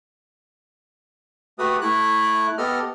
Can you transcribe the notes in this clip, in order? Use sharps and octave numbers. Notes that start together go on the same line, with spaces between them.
A3 F#4 G4 B4 D#6
A3 E4 F#6
B3 G4 A4 D#5 F6